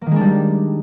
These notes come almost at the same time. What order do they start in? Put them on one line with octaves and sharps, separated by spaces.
A#3 D#3 G#3 D4 G3